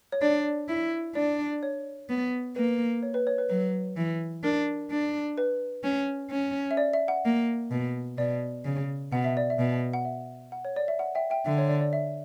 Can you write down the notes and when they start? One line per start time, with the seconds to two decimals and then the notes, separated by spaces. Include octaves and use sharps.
0.12 C#5
0.21 D4 D5
0.68 E4
1.15 D4 D5
1.63 C#5
2.09 B3
2.56 A#3 B4
3.03 C#5
3.14 B4
3.27 C#5
3.38 B4
3.50 F#3 B4
3.97 E3
4.43 D4 A#4
4.90 D4
5.38 B4
5.83 C#4
6.31 C#4
6.71 E5
6.77 D5
6.93 E5
7.08 F#5
7.25 A#3
7.71 B2
8.18 B2 D5
8.65 C#3
9.12 B2 F#5
9.24 E5
9.37 D5
9.50 E5
9.59 B2
9.93 F#5
10.05 E5
10.52 F#5
10.65 C#5
10.76 D5
10.88 E5
10.99 F#5
11.15 E5 G5
11.30 E5 G5
11.46 D3 E5
11.58 C#5
11.69 D5
11.81 D5
11.93 E5